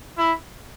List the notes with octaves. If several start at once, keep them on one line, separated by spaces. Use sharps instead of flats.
E4